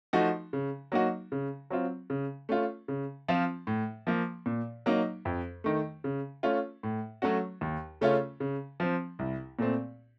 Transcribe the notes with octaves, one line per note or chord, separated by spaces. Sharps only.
F3 A3 D#4 F#4
C#3
F#3 A#3 D#4 F#4
C#3
F#3 C4 F4
C#3
A3 C#4 F4
C#3
F3 C4 F4
A2
F3 A#3
A#2
F#3 A#3 D#4
F2
D#3 A3
C#3
A3 C#4 F4
A2
F#3 A3 C#4 F#4
D#2
C#3 A3 C#4 F4
C#3
F3 C4
C2
A#2 A3 C4